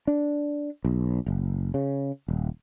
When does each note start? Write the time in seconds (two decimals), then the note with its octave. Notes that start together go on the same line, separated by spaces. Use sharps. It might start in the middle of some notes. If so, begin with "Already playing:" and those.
0.07 D4
0.85 B1
1.26 F#1
1.74 C#3
2.28 D#1